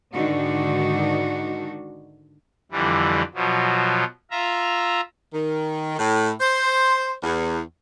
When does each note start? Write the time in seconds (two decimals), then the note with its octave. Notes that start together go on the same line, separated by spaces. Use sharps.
0.13 G#2 D3 D#3 D4 D#4 F#4
2.72 F2 D3 E3 G3
3.34 B2 F3 F#3
4.31 F4 E5 A#5
5.34 D#3
5.99 A2
6.41 C5
7.23 E2